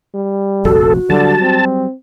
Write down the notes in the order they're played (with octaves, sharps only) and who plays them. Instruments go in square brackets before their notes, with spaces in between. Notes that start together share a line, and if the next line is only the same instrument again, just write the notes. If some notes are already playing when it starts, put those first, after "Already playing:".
[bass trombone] G3
[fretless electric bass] F1 A#1 F2 [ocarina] F#4 [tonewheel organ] A4
[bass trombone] D3 [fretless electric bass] F#3 G3 [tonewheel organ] A5
[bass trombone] C4